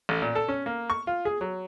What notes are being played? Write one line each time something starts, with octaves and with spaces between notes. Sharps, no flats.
A1
A#2
A4
C#4
A#3
C#6
F4
G#4
F#3